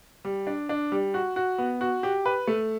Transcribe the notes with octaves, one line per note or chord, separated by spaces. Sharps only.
G3
D4
D4
G3
F#4
F#4
B3
F#4
G4
B4
A3